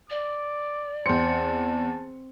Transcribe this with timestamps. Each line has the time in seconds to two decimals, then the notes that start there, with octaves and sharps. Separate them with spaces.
0.10 D5 D6
1.06 E2 C4 A5 C#7